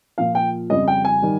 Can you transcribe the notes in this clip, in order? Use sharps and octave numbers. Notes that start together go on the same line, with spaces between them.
A#2 F3 F5
G5
F2 C#3 G3 D#5
G5
G#5
D#3 G3